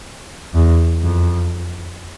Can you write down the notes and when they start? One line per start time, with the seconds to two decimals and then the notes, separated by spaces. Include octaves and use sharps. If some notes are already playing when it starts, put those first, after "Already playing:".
0.55 E2
1.03 F2